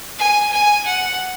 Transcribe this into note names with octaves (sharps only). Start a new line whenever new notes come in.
G#5
G#5
F#5